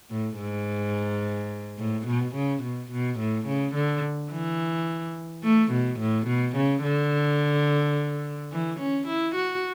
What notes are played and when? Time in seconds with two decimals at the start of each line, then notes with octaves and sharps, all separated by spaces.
0.11 A2
0.39 G#2
1.78 A2
2.06 B2
2.35 C#3
2.63 B2
2.91 B2
3.19 A2
3.47 C#3
3.75 D3
4.31 E3
5.43 A3
5.72 B2
6.00 A2
6.27 B2
6.56 C#3
6.83 D3
8.52 E3
8.80 C#4
9.07 E4
9.35 F#4